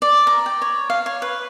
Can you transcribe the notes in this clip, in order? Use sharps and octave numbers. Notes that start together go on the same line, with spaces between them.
D5
A#5
G5
C#5
F5
C#5
B4